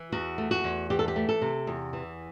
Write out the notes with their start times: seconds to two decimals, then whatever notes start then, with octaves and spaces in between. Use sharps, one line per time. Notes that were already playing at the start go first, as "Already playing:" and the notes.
Already playing: E3
0.12 E2 F#4
0.38 A3
0.51 F#4
0.64 E2
0.90 E3 G4
0.99 A4
1.08 G4
1.16 A3
1.29 A4
1.41 C3
1.67 E2
1.93 E3